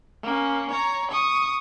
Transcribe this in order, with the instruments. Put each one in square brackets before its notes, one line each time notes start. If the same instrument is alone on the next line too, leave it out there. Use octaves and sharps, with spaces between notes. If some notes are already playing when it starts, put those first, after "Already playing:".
[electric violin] A#3 C#4
C#5 A#5
C#6 D#6